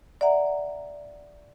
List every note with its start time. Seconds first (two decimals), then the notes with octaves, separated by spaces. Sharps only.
0.21 D5 E5 F#5 A#5